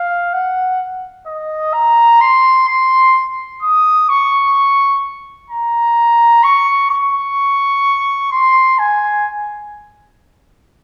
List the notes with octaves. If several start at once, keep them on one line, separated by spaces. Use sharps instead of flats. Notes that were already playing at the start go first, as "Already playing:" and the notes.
Already playing: F5
F#5
D#5
A#5
C6
C6
D#6
C#6
A#5
C#6
C#6
C6
G#5